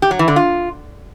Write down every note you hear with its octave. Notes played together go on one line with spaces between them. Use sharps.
G4
F#3
E3
D3
F4